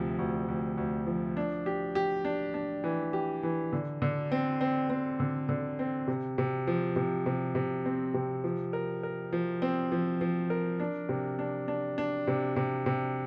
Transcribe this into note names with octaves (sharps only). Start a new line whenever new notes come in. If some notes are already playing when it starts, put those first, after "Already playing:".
Already playing: D2 C3 F3
D2
D2
D2
F3
D4
G4
G4
D4
D4
E3
G4
E3
D3
D3
C4
C4
C4
D3
D3
C4
C3
C3
F3
C3
C3
C3
C4
C3
F3
A#4
A#4
F3
C4
F3
F3
A#4
D4
C3
D4
D4
D4
C3
C3
C3